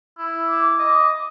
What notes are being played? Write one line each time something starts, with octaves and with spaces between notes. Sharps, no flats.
E4
D6
D#5